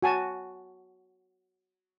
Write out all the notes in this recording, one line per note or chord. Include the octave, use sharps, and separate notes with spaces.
F#4 G#5 A5